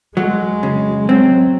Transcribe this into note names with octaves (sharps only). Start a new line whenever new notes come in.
F#3 G#3
C#3
F#3 C4